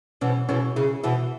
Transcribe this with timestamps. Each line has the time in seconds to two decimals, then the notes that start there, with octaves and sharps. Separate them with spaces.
0.21 B2 E3 C#4
0.49 B2 E3 C#4
0.76 C#3 E4
1.04 B2 E3 E4